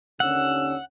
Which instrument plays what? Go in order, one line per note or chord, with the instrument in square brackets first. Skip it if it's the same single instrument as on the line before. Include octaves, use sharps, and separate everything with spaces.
[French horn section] D#2 D3 C#4 [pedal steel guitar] F#5 [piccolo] E6